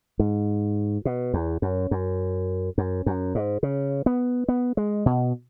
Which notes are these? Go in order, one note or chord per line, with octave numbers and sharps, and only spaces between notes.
G#2
B2
E2
F#2
F#2
F#2
F#2
G#2
C#3
B3
B3
G#3
B2